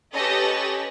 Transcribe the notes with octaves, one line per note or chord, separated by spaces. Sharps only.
C#4 G4 A4 B4 D#5